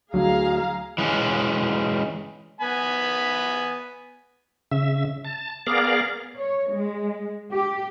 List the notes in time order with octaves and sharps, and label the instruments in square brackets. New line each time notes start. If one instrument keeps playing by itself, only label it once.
[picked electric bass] D2 F#3 [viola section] G#4 F5 A#5
[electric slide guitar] E3 G#3 C#4
[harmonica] B3 G#5 B5
[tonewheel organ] C#3 E5
A5
B3 G#4 A#4 D5 F5
[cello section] C#5
G#3
G4